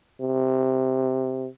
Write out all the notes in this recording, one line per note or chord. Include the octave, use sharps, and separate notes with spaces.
C3